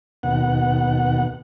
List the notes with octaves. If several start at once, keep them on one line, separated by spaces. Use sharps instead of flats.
D#2 B2 F#5